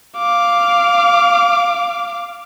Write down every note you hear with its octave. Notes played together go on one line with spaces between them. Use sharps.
F5 D6